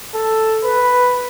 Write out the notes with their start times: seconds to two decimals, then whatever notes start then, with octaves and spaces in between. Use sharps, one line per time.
0.15 A4
0.64 B4